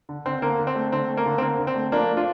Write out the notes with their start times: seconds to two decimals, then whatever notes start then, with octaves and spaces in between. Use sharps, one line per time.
0.09 D3
0.26 D3 C4
0.42 D3 A#3
0.59 D3
0.67 C4
0.75 A3
0.92 D3 C4
1.09 A3
1.17 A#3
1.26 D3
1.38 C4
1.42 D3 A#3
1.59 D3
1.67 C4
1.75 A3
1.92 F3 A#3 D4
2.08 A3
2.17 D4 F4